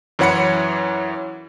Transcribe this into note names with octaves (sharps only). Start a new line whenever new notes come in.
F#2 E3 C#5 F#5 B5 C#7